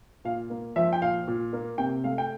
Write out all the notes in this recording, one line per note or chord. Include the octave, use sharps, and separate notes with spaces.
A#2 F5
A#3
F3 E5
G5
A#2 F5
A#2
A#3
C3 G5
A3 F5
G5